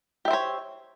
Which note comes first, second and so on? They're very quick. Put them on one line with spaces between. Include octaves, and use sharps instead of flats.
G4 E5 C5 C#5